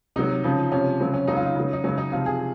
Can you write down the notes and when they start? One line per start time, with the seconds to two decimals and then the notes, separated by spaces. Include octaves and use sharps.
0.16 C3 F#3 D#4
0.44 C#3 F3
0.72 C3 F3 C#4
1.00 C#3 F#3 C4
1.13 C#4
1.28 C#3 F#3 D#4
1.37 F4
1.46 D#4
1.56 C#3 F#3
1.73 D#4
1.84 C#3 F#3 C#4
1.98 D#4
2.12 C3 F3 F4
2.26 G#4